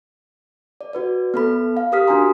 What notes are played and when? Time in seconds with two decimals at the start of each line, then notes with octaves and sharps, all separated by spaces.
0.81 D5
0.93 F#4 B4 D5
1.34 B3 A4 B5
1.77 F5
1.92 G4 A#4 D#6 F6 B6
2.07 D4 F#4 G4 G#5 A#5 C6